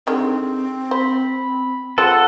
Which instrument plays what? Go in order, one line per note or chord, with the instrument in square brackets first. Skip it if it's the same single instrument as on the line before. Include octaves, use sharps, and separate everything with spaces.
[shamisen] D3 D#3 G#3 [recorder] C4
[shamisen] C5 [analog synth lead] B5
[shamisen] G#3 C4 F4 [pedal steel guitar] A4 [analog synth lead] F#5